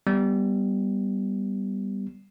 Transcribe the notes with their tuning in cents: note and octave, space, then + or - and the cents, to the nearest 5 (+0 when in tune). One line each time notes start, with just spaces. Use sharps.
G3 +0 B3 +0